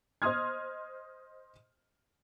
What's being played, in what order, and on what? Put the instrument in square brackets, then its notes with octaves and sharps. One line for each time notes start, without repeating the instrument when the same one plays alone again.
[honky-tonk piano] C5 D#5 C6 D#6 F6 G#6